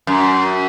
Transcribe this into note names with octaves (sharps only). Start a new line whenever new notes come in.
F#2